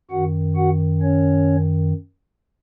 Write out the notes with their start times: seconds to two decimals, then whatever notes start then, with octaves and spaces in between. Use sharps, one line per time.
0.11 F#2 D#3 F#4 F#5
0.56 F#4 F#5
1.02 C#4 C#5